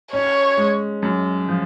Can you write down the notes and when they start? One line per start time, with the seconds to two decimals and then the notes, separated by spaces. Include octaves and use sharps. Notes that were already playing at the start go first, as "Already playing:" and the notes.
0.13 C#4 C#5
0.57 G#3
1.03 F#2
1.48 F3